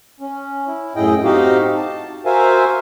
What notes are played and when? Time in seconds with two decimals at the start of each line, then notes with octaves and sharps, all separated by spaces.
0.20 C#4
0.67 E4
0.96 F#2 A2 E4 G#4 D#5 G5
1.24 C4 D#4 F#4 G4 D#5 F5
1.77 A5
2.26 F#4 A#4 C5 E5 F5 G#5